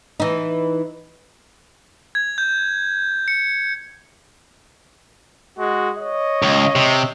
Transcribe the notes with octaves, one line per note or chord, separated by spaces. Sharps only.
E3 D#4
G#6
G6
C#7
G#3 F#4
C#5 D#5
C#2
C3